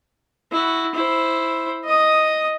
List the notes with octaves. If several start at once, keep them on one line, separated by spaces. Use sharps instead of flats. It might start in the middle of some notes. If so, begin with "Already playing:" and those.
E4 F#4
E4 C5
D#5 D#6